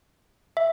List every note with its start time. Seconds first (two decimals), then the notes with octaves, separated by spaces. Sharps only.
0.57 E5